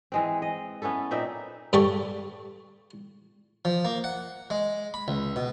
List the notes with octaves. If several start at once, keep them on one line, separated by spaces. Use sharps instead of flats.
E3 G#3 C4
D#5
B3 C#4 E4 A4
A#2 C4 D#4 E5
G2 D3 G4 A4 C#6
F3
A#3
F#5
G#3
B5
C#2
B2